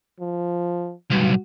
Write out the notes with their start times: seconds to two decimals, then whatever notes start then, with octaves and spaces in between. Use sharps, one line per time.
0.20 F3
1.10 B1 G2 F#4